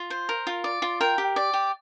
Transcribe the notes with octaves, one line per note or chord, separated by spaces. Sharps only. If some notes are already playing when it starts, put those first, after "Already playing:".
Already playing: F4
C5
A#4
F4
D5
F4
A#4 G5
G4
D5
G4